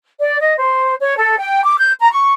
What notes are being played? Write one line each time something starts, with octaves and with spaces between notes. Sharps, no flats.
D5
D#5
C5
C#5
A4
G5
D6
G6
A#5
C#6